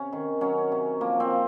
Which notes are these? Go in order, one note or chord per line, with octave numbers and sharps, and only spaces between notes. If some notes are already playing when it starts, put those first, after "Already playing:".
Already playing: C3 C#4
D#3
F#3 C#4
C3
F3 A#3
C4
F3